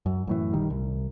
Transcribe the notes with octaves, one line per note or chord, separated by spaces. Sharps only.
F#2
F#2 A2 E3
A#1 D#3 G3
C2